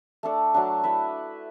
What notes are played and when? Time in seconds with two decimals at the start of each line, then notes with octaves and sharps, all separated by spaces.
0.23 A3 D4 A4 D5
0.54 F#3 A3 D4
0.84 E4 B4 E5